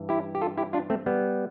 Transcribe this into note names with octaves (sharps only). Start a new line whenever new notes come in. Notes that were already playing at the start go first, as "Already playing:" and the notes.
Already playing: G2 E3
E4 G4
G4
F4 A4
E4 G4
D4 F4
A3 C4
G3 B3